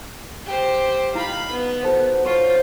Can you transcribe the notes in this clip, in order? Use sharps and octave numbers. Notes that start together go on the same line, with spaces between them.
G4 C5
D#4 F4 F5 A#5 B5
B3
F#4 A4 C5
F4 C5 C#5